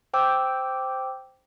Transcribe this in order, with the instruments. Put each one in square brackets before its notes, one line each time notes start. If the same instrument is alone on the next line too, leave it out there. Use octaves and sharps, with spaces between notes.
[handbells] C5 G5 D6 E6